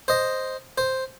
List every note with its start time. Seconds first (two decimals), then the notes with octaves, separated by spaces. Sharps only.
0.08 C5 D#5
0.78 C5